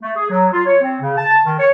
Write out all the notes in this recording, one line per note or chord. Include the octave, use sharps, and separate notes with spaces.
A3
G#4
F#3
F4
C#5
C4
C#3
A5
D#3
C#5